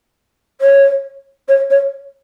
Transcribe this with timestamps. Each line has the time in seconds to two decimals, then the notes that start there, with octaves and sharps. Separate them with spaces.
0.61 C#5
1.48 C#5
1.70 C#5